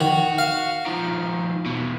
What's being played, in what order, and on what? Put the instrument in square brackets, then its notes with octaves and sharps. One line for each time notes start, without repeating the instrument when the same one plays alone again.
[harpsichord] D#3 [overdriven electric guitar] F#4
[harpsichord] F5
[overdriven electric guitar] D#3 F3
E2 B2